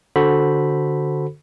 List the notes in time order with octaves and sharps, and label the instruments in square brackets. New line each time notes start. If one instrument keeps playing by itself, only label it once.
[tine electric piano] D3 F#4 A4 C5 B5